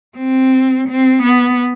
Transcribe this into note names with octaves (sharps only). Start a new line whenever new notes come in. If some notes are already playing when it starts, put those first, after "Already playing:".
C4
C4
B3